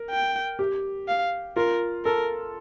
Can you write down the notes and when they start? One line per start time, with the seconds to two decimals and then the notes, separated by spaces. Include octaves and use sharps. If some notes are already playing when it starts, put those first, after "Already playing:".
Already playing: A#4
0.10 G5
0.59 G4
1.08 F5
1.56 F4 A#4
2.05 A4 A#4